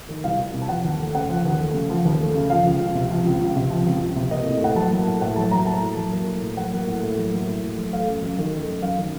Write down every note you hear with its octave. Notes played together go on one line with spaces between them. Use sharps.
D#3
C2 F5
C2
C3
A5
F3 F#5
D#2
A3
C#3 F#5
F3
D#2
A3
C#3
F3
D#2
A3
C#3
F3 F5
C#2
C#2
C3
F3
C#2
C#2
C3
F3
C#2
C#2
C3
A#3 D#5
A2
A2 F#5
F#3 A5
A#3
A2
A2 F#5
F#3 A5
A#3 A#5
A2 A5
A2
F#3
A#3
A2
A2
F#3 F#5
A#3
A2
A2
F#3
A#3
A2
A2
F#3
A3 F5
F#2
F#2
D#3
A3
F#2
F#2 F5
D#3